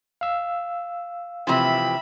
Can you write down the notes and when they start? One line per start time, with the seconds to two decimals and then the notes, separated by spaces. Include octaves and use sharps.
0.21 F5 E6
1.47 C3 E3 F3 E5 G5 B5